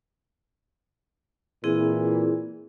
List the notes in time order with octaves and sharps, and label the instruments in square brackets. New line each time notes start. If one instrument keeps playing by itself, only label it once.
[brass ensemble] A#2 E3 [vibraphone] C4 E4 G#4